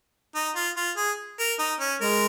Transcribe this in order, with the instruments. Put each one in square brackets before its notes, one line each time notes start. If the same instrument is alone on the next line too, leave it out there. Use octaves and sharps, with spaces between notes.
[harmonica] D#4
F4
F4
G#4
A#4
D#4
C#4
[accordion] G#3 [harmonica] A#4